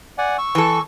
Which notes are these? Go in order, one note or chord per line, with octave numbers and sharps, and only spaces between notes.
D5 F#5 G#5
C#6 E6
E3 A4